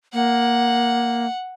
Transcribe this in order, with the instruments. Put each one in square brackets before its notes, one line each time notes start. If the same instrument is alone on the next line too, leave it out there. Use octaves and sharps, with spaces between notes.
[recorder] A#3 [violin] F#5